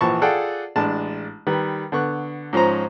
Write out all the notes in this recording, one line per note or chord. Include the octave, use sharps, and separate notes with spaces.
A#1 E3 F3 A5 C#6
F4 G#4 A4 D5 F#5 G5
A1 G#3 D4 A5
D#3 G3 B4
D3 B3 C#6 F#6
G#2 F3 C#4 C5 A#5